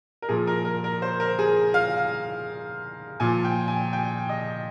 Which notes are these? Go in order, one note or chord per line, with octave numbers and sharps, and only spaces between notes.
A#4
A#2 F3 G#4
A#4
A#4
A#4
C5
A#4
G#4
F5
A#2 F3 G#5
G5
G#5
G5
D#5